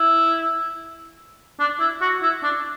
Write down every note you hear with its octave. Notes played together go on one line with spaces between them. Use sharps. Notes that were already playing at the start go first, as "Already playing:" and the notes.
Already playing: E4
D4
E4
F#4
E4
D4